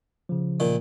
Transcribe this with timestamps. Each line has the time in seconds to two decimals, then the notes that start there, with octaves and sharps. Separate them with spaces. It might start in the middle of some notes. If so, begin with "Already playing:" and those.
0.29 C#3 F3
0.60 A#2 D#3